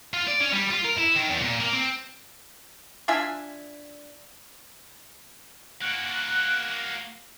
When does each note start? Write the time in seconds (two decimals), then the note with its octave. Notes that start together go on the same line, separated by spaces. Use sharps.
0.14 F4
0.27 D5
0.40 C#4
0.53 G3
0.71 F4
0.85 A#4
0.98 E4
1.16 D#3
1.29 E2
1.41 A#2
1.60 A#3
1.73 C4
3.08 D4 F4 E5 G#5
5.82 A#3 F#4 F#6